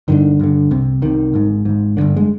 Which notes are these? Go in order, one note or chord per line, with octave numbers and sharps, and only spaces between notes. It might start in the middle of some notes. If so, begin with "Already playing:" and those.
G1 G2 D3 D#3
G1 G2 D3
C2 C3
C2 C3 D#3
G#1 G#2
G#1 G#2
G1 G2 D3
G#3